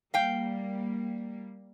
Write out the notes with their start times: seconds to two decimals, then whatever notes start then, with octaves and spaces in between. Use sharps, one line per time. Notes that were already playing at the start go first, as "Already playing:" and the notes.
0.14 G3 A#3 F5 G5